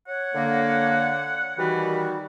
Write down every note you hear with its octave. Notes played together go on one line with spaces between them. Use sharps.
C#5 F#5
D3 A#3
D#3 E3 G3 F#4